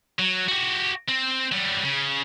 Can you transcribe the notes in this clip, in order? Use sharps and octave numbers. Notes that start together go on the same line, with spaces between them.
F#3
F#4 G4
C4
F#3 G3
C#3